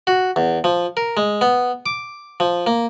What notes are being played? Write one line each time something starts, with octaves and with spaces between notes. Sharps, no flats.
F#4
E2
F3
A#4
G#3
B3
D6
F3
A#3